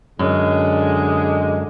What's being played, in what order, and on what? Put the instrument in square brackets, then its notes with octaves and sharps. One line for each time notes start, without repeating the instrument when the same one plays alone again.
[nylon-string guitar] F#2 [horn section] D3 G#3